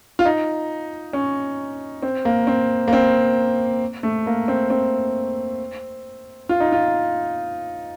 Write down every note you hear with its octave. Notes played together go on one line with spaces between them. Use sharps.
F4
D#4
C#4
C4
A#3
C4
A#3
C4
A3
A#3
C4
C4
F4
D#4
F4